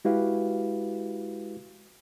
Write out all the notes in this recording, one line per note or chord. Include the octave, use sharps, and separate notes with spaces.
G#3 E4 F#4 G4 B4 F5